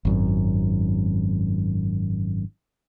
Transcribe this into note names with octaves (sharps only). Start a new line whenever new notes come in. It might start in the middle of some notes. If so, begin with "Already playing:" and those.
G#1 F#2